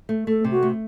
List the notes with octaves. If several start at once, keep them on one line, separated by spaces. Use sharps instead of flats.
A3
A3 A4
C3
F#4
A3